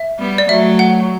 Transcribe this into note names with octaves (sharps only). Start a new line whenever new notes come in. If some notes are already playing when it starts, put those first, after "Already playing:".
Already playing: E5
G3 B3
D5
F#3 A3 E5
F#5